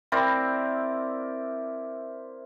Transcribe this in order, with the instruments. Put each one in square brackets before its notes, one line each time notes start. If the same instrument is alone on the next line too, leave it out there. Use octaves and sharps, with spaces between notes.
[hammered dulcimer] C4 E4 A#4 D5